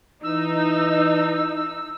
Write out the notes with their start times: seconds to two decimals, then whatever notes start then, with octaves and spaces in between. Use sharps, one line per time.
0.24 E3 D#4 E6